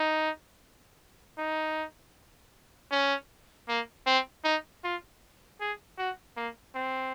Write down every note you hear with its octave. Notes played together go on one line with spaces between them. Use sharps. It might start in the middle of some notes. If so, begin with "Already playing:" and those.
Already playing: D#4
D#4
C#4
A#3
C4
D#4
F4
G#4
F#4
A#3
C4